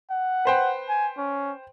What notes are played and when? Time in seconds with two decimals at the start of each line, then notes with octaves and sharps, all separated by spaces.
0.11 F#5
0.45 B4 C5 G5
0.89 G#5
1.18 C#4